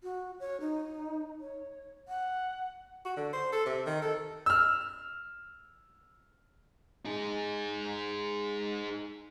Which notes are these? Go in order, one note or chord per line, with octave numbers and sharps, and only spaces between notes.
F#4
C#5
D#4
C#5
F#5
F#4
D3
C5
A4
C3
D#3
A4
E6 F6
D#4 G#4